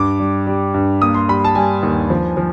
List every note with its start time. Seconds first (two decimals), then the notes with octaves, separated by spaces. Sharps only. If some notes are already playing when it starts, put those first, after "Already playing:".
Already playing: G2 D6
0.20 G3
0.47 G3
0.74 G2
1.02 A#3 D#6
1.14 C6
1.28 G3 B5
1.44 A5
1.55 G3 G#5
1.83 D#2
2.10 F3
2.37 F3